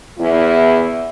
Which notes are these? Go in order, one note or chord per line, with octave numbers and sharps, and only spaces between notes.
E2 E4